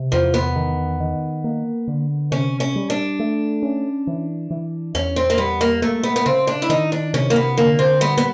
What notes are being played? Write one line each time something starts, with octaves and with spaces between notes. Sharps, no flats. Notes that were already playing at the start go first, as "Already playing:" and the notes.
Already playing: C3
E2 F3
B3
D#3
D#3
A#3
D3
C3 C#4
C#4
G3
D4
A3
C#4
E3
E3
E2 C#4
C4
A#3
G3 B3
A#3
A3 A#3
B3
B3
C#3 C4
D4
E4
D#3 D#4
D4
C3 C#4
A#3
B3
D3 A#3
C4
G3 B3
B3